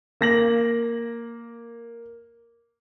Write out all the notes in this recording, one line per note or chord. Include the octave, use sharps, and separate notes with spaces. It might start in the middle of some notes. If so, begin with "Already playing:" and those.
A#3 A#6 F#7